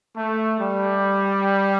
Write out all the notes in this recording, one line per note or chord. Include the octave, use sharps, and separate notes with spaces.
A3
G3